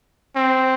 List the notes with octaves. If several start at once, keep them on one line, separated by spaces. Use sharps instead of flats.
C4